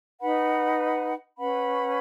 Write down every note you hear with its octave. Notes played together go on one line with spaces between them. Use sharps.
D#4 B4 F#5 B5
C#4 B4 F#5 B5